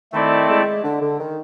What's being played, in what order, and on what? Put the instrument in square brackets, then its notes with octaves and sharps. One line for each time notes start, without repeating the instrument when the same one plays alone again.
[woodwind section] D#3 [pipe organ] A3 C4 E4 A4 D5
[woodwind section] G#3
D3
D3
D#3